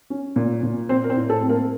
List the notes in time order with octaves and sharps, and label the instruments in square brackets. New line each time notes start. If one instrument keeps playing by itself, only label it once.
[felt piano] C#4
A#2
A#2
C4 C5
A#4
C4 C5
A2
A4
C4
A#3 A#4